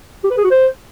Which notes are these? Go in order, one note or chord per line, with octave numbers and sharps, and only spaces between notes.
G4
B4
G#4
F#4
C5